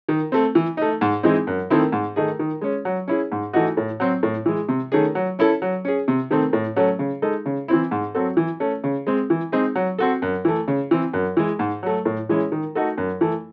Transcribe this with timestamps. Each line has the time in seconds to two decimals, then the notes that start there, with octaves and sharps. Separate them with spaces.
0.09 D#3
0.32 A3 C4
0.55 E3
0.77 A3 D#4
1.01 G#2
1.23 E3 G#3 C4 D#4
1.47 F#2
1.70 D#3 A3 C4 E4
1.92 G#2
2.16 D#3 A3 D#4 G#4
2.39 D#3
2.61 G#3 C#4
2.85 F#3
3.08 C#4 E4 G#4
3.32 G#2
3.53 E3 A3 D#4 F#4
3.77 A2
4.00 F#3 C4
4.23 A2
4.46 E3 G#3
4.69 C3
4.92 D#3 A3 C#4 G#4
5.15 F#3
5.39 C#4 E4 A4
5.62 F#3
5.85 C#4 G#4
6.08 C3
6.31 D#3 A3 C4
6.53 A2
6.76 F#3 A3 C#4
6.99 C#3
7.22 G#3 D#4 A4
7.46 C#3
7.68 E3 C4 E4
7.91 G#2
8.15 F#3 C4 F#4 A4
8.37 E3
8.60 A3 C#4
8.84 C#3
9.07 G#3 C4
9.30 E3
9.52 G#3 C4 D#4 G#4
9.75 F#3
9.98 C4 F#4 A4
10.22 F#2
10.45 E3 A3
10.68 C#3
10.91 E3 C4
11.13 F#2
11.37 E3 G#3
11.59 G#2
11.83 F#3 A3
12.05 A2
12.29 E3 G#3 C#4 E4
12.52 D#3
12.75 A3 D#4 F#4 A4
12.98 F#2
13.21 E3 A3